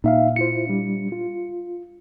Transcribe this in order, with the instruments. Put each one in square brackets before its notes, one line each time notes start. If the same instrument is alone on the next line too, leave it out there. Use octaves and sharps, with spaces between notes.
[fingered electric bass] A#2 [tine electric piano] D#4 E5 F5
[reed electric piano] E4 F4 C5 [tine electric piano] C#7
[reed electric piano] G3 D4
F4